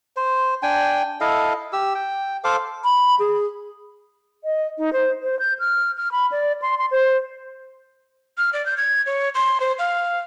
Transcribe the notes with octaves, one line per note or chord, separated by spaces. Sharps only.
C5
D4 G5 G#5
E4 A4 D#5 F5
G4 E6
G5
A4 C5 F5 D6
B5
G#4
D#5
D#4
C5
C5
G6
F6
F6
B5
D5
C6
C6
C5
F6
D5
G6
G#6
C#5
C6
C5
F5